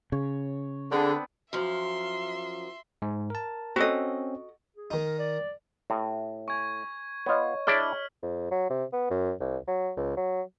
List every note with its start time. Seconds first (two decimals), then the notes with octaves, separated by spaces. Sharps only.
0.12 C#3 C#5
0.91 D3 B3 C4 D4 G#4
1.53 F#2 F3 E5 C6
3.02 G#2
3.30 A#4 A5
3.76 C4 C#4 F#4 A4 D#5
4.76 G#4
4.91 D#3 D#4
5.05 A#4
5.19 D5
5.90 A2 G4 E5
6.48 G#5 C#6 G#6
7.26 B3 F4 C#5 D#5
7.67 D4 E4 G#4 C#5 D5 F6 B6 F#7
8.22 F2
8.51 F#3
8.70 C3
8.93 B3
9.10 F#2
9.40 C2
9.67 F#3
9.97 C#2
10.17 F#3